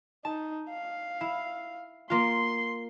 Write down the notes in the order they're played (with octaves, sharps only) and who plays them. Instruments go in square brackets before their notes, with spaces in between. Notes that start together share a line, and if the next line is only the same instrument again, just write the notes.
[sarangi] D#4 [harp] A5
[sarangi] F5
[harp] E4
[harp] A#3 F4 [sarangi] C6